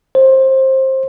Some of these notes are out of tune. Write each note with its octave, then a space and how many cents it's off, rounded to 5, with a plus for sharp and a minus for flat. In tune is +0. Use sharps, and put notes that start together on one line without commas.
C5 +20